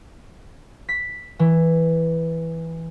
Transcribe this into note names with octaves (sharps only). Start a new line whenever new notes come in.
B6
E3